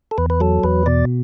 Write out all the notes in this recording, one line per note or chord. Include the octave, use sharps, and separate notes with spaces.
A4
E2 B4
B4
F#3 A4
E2 B4
B2 D5